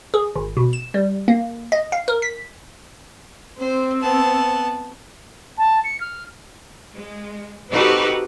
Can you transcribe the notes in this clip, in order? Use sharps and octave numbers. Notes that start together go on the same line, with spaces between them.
G#4
G#1
B2
E7
G3
A#3
D#5
F5
A#4
B6
C4 C5
B3 A5
A5
C#7
F6
G#3
C4 D#4 F#4 G4 A4 B4